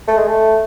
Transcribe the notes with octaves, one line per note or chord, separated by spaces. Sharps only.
A3
G#3
A3